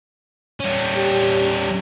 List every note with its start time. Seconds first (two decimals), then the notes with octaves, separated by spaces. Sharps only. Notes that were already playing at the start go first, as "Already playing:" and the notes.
0.60 G3 C#4
0.97 G4